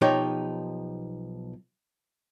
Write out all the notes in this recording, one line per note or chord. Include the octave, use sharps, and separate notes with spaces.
B1 F3 D#4 G4 C#5